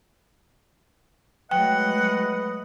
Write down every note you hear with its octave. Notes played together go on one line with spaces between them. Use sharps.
F#3 G#3 A3 B4 D#5 F#5 G5